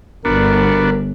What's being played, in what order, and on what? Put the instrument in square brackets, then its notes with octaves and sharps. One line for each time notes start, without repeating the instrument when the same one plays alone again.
[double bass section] G1 [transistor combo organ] B3 D4 F#4 [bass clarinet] A#4